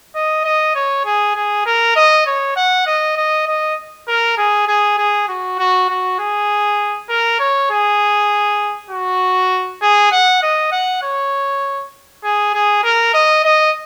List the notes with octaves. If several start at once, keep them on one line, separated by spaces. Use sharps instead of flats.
D#5
D#5
C#5
G#4
G#4
A#4
D#5
C#5
F#5
D#5
D#5
D#5
A#4
G#4
G#4
G#4
F#4
F#4
F#4
G#4
A#4
C#5
G#4
F#4
G#4
F#5
D#5
F#5
C#5
G#4
G#4
A#4
D#5
D#5